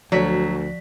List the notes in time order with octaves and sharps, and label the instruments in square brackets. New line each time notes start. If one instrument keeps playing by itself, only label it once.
[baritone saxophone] D2 [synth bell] F3 D5 B6 [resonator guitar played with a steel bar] F#3